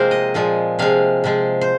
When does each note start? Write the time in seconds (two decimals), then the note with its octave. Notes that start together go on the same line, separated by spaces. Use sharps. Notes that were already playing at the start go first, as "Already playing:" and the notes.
Already playing: C3 F3 G#3 A#3 C4 A#4 C5
0.11 D#5
0.34 A#2 F3 G#3
0.79 C3 F3 G#3 F5
1.24 C3 F3 G#3
1.61 C5